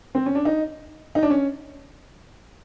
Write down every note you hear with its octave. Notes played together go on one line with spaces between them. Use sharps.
C4
C#4
D4
D#4
D#4
D4
C#4